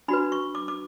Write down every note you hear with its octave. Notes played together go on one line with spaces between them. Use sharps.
D4 F#4 B4 B5
C#6
D6
D6